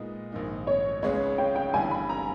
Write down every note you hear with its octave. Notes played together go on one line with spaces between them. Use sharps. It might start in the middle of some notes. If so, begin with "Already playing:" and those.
Already playing: A#2 G#3 B3 D#4
A#1 G#2 D#3 A#3 D#4
C#5
C#2 C#3 G#3 B3 C#5
G5
G5
G1 G2 E3 G3 G#5
B5
A#5